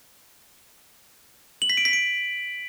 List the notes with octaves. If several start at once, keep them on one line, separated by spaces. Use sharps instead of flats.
F#7
B6
D7
B6
D7